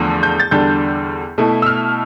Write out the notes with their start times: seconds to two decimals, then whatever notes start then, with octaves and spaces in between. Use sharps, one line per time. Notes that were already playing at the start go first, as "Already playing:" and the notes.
Already playing: E2 D3 F3 A3
0.23 G6
0.40 A6
0.51 E2 D3 G3 D4 G6
1.38 B2 A3 E4
1.62 E6
1.66 F6